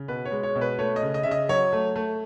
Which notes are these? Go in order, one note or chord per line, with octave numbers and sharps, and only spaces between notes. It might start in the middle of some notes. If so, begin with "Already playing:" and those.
Already playing: C#3
B2 B4
C#5
G#3
C#5
B2
B4
A3 C#5
D#5
C#3
D#5
C#3 E5
D#5
F#3 C#5
A3
A3